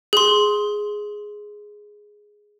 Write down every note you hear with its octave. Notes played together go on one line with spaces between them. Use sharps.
G#4 C6